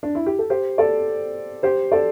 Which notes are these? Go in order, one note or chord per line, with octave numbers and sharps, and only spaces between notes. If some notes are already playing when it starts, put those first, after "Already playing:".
D4
E4
G4
A4
G4 C5
A4 D5
G4 C5
A4 D5